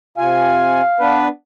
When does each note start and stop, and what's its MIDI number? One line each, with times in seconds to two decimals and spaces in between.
0.18 0.81 48
0.18 0.81 65
0.18 1.23 77
0.18 0.81 80
1.00 1.28 59
1.00 1.28 62
1.00 1.28 71